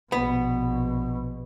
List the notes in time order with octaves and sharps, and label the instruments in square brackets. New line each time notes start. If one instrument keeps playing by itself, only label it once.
[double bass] A#1 B2 [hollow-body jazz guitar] B3